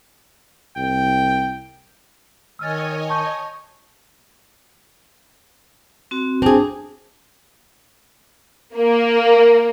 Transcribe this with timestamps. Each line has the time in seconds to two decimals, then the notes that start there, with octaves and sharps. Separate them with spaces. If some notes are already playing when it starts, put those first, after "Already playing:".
0.77 C2 G5
2.59 D#3 C#5 D#5 G#5 E6 F6 A6
3.09 A5 C#6 G6
6.11 C4 F#4
6.42 C4 D4 G#4 A5
8.76 A#3